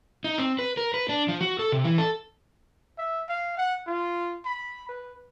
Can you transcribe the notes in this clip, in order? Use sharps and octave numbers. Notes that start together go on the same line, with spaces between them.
D#4
C4
B4
A#4
B4
D4
F3
F#4
A4
C3
E3
A4
E5
F5
F#5
F4
B5
B4